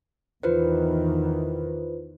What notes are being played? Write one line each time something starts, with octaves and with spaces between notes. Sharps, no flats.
E2 D#3 E3 F4 B4 C5